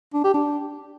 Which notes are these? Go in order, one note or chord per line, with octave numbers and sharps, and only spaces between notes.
D4
G4
D4